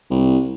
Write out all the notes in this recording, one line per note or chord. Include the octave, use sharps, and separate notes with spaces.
C2